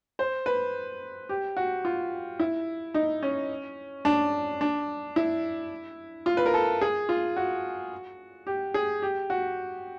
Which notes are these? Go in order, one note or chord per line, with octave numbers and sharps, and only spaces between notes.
C5
B4
G4
F#4
F4
E4
D#4
C#4
D4
D4
E4
F4
B4
A#4
A4
G#4
F4
F#4
G4
G#4
G4
F#4